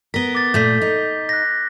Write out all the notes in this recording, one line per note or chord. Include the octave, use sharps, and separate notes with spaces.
B3 A#4 B6 G7
D6 A6
A#2 A3 G6 B6
D#4
F#6 A#6